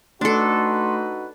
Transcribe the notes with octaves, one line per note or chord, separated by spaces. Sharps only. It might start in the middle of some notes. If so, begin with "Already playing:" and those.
A3 D4 D#4 F#4 A4 B4 C6